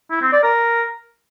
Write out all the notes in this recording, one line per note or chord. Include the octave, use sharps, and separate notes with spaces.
E4
C4
D5
A#4